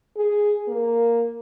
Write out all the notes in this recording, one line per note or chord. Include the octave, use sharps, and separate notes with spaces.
G#4
A#3